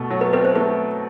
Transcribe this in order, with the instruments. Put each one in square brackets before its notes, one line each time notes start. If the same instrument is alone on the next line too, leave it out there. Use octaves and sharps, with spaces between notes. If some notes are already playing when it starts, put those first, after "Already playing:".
Already playing: [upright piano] B2 A3
F#3
[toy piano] B4
[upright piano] C4 [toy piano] B4
[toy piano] C5
[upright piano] A3 [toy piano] B4